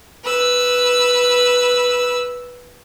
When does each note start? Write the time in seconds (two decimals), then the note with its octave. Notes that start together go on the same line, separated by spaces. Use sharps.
0.24 B4 E6